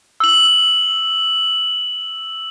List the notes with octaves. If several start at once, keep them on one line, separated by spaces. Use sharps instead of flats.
E6 F#7